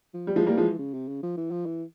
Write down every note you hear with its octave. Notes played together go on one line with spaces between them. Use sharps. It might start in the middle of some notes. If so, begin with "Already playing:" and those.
F3
G3
E3 F3 G#3
G3 A#3
F3 G#3
C#3
C3
C#3
F3
E3
F3
E3